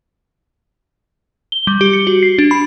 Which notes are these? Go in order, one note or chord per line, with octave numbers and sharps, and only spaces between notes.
G7
G3
G4
C#7
F#4
C7
D4
B5